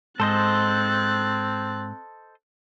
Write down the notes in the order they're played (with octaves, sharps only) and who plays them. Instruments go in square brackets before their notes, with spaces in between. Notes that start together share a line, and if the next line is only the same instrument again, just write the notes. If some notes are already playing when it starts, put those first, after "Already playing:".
[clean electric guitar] G#2 [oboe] C4 [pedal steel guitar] A4 C5 D#5 [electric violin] F#6 A6